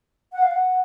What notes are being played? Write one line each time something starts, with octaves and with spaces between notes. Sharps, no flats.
F#5
F5
F#5